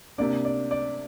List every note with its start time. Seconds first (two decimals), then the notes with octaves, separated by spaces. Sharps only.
0.18 C3 A#3 D4 D5
0.45 D5
0.71 D5